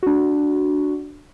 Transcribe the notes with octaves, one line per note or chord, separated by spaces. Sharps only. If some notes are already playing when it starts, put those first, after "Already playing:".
D4 F#4